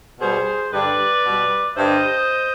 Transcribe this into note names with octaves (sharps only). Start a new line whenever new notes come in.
B2 G3 G#4 C5
G2 D3 G3 B4 D5
B2 G3
G2 D3 G3 C5 D#5